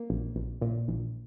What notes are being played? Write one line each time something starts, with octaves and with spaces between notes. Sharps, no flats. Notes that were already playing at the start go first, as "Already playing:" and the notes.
Already playing: A#3
A#1
A#1
A#2
A#1